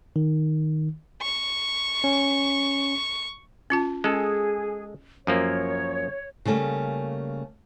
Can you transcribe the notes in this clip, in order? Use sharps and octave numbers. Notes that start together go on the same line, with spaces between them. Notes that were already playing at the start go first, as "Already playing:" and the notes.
D#3
C#6
C#4
C#4 F4 A5
G#3 C#4 G#4 A4
F#2 F3 A#3 C#5
C#3 G3 A3 A#3